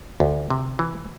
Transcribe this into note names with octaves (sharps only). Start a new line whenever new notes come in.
D2
C3
E3